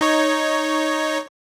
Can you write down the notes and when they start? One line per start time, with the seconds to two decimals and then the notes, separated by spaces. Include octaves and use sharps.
0.01 D#4 C#5